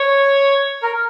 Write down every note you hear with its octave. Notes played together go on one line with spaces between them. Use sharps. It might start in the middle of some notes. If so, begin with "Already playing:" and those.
Already playing: C#5
A#4